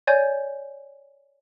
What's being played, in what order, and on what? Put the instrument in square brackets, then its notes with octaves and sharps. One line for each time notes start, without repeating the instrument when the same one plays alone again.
[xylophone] C#5 D5 G#5 G6